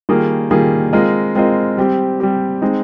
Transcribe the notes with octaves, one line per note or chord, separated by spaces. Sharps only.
D#3 G3 A#3 F4 G#4
D#3 G3 A#3 F4 G#4
G#3 C4 F4 A#4 D#5
G#3 C4 F4 A#4 D#5
G3 C4 G4
G3 C4 G4
G#3 C4 D#4